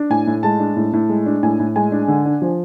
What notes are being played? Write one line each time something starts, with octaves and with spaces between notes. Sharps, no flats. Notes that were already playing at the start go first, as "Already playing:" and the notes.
Already playing: D4
A2 G#5
A2
G#3 A5
D4
A2
A2
G#3
D4
A2 G#5
A2
G#3 G#5
D4
D3
D4
F3